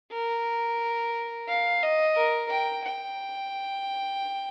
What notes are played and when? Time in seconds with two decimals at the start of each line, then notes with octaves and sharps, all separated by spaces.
0.13 A#4
1.49 F5
1.83 D#5
2.17 A#4
2.51 G5
2.85 G5